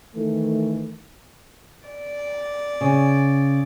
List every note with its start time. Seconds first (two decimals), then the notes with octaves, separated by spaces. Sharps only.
0.16 D#3 E3 A3
1.88 D5
2.81 C#3